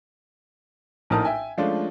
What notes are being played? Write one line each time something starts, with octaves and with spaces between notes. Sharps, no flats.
A#1 A2 D#4 A#4 A5 D#6
E5 G5 G#5
F3 G#3 A3 C#4 D4 F4